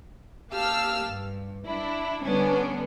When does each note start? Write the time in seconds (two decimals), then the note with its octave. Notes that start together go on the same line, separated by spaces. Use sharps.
0.51 A#3 G4 F5 A5 E6 F6
1.05 G2
1.65 D4 E4
2.23 D3 G3 B3 C#4 D4